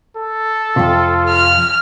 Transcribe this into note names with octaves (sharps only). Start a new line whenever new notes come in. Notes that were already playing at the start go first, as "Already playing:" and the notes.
A4
F2 C3 F4
F6